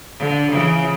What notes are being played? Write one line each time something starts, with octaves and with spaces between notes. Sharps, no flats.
D3
C#3 E3